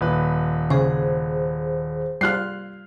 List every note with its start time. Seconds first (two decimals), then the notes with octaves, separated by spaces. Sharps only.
0.01 D#1 B4
0.70 C#3 G#4 C5
2.21 G3 F4 F6 F#6 C7